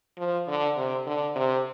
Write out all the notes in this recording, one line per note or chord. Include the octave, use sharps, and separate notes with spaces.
F3
D3
C3
D3
C3